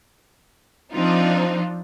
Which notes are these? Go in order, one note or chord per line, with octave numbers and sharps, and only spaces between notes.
F3 C4 D4 D#4 F4